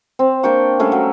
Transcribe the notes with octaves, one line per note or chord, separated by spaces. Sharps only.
C4
A#3 D4 G5 C#6
G3 A3 C#4 F5
F#3